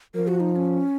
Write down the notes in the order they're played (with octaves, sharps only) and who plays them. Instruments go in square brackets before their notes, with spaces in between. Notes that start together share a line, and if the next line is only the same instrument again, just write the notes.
[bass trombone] F3 [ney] A#4
[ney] F#4
D#4
D#4
C#4